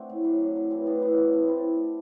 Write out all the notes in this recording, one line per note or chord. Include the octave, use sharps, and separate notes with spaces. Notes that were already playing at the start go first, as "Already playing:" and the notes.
Already playing: A3 C4 D4 F#4
A2
F#3
A2
F#3
E3 A3 C4
A2 B3 D4
A2 B3 D4
E3 B3
A2 A3 C4
A2 C4 E4